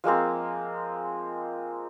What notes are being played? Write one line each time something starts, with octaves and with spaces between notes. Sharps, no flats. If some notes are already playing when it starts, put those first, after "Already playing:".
F3 G#3 A#3 C4